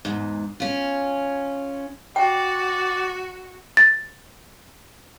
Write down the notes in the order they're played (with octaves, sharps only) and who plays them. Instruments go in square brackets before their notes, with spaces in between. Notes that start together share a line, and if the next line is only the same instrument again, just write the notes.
[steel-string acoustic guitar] E2 G#2
C#4 F4
[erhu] F#4 [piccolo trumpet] D5 [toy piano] G5
[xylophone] A6